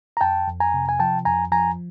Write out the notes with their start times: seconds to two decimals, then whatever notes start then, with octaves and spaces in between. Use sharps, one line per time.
0.17 A#5
0.21 F2 G5 A5
0.48 F2
0.60 G#5 A#5
0.74 C3
0.89 G#5
1.00 F3 G5 A5
1.25 F2 G#5 A#5
1.52 F3 G#5 A#5